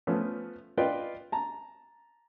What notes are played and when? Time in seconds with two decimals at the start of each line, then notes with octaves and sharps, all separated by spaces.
0.07 F3 A3 B3 C#4
0.78 F4 B4 D5 D#5 G5
1.32 A5 A#5